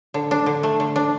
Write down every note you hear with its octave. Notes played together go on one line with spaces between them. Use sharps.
D3
D4
D3
A3
D3
D4